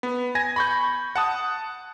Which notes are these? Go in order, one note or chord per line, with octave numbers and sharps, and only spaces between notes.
B3
G#5 G#6 A#6
B5 C#6 G6
F#5 A5 D#6